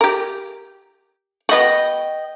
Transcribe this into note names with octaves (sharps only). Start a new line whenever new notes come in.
G4 A#4
B3 F#4 D#5 G5